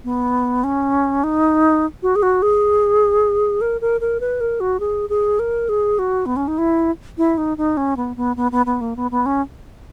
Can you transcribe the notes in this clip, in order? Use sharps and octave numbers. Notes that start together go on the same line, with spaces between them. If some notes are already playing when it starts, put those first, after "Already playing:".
B3
C#4
D#4
F#4
G#4
F#4
G#4
A#4
A#4
A#4
B4
A#4
F#4
G#4
G#4
A#4
G#4
F#4
B3
C#4
D#4
E4
E4
D#4
D#4
C#4
B3
B3
B3
B3
B3
A#3
B3
B3
C#4